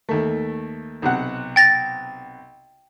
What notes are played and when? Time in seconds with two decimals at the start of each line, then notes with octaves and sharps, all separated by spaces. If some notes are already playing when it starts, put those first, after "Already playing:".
0.09 D#2 A3
1.02 B1 C3 F#5
1.56 G5 A6 A#6